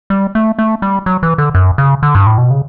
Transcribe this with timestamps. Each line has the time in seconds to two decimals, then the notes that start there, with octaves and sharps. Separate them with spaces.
0.10 G3
0.35 A3
0.59 A3
0.82 G3
1.06 F#3
1.23 E3
1.38 D3
1.55 F#2
1.78 C#3
2.03 D3
2.15 G2
2.26 A2
2.38 B2
2.51 C#3